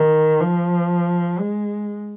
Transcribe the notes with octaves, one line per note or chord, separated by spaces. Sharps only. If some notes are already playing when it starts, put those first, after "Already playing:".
Already playing: D#3
F3
G#3